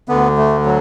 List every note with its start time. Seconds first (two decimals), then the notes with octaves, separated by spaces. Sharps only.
0.08 D2 D3 B3
0.37 A3
0.65 F#3